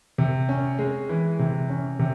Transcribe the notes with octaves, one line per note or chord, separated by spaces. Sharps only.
C3
C#4
G#3
E3
C3
C#4
C3